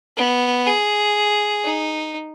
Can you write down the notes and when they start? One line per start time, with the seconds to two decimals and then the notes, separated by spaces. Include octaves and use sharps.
0.17 B3
0.67 G#4
1.64 D#4